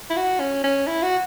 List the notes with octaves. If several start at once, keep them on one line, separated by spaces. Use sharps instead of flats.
E4
F#4
C#4
C#4
E4
F#4